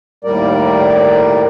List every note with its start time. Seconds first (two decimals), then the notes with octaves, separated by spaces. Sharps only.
0.24 D#2 A2 G3 A#4 D5